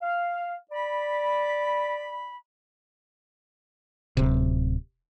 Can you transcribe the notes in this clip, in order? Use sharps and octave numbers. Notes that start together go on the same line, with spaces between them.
F5
D5 B5
D1 C3